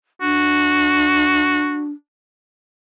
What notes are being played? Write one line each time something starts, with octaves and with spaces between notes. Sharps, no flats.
D4 F#4